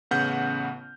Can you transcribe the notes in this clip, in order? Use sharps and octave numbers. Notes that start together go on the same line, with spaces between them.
A1 C#3 B3 F#5 F6 G6